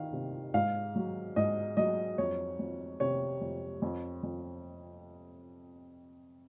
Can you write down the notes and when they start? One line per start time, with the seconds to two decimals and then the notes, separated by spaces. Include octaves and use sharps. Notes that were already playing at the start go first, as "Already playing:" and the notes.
Already playing: D#3 F5
0.13 C3
0.54 G#2 F5
0.96 F#3
1.36 G#2 D#5
1.77 F#3 D#5
2.18 F2 C#5
2.59 F2
3.00 C3 C#5
3.41 F2
3.82 F2
4.23 F2